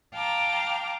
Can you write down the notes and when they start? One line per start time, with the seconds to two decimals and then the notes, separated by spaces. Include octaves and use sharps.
0.14 F5 G5 A5 A#5 D6